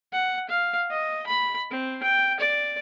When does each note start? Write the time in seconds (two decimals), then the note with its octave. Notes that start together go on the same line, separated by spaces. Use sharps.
0.12 F#5
0.49 F5
0.91 D#5
1.27 B5
1.70 C4
2.03 G5
2.40 D5